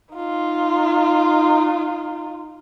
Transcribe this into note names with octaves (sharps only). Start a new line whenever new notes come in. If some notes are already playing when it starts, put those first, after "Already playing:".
D#4 F4